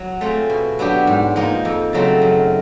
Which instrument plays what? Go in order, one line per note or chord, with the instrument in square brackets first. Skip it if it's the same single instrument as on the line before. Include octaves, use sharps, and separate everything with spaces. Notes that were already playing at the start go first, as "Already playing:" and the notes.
Already playing: [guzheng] F#3
A3 C4 F4 G#4
B2
F#3 B3 D4 G4
G#2
F3 A#3 D#4
F2
C#3 F#3 A3 C4
F#2